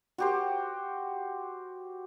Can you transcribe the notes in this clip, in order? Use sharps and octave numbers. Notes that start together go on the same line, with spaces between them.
F#4 G4 C5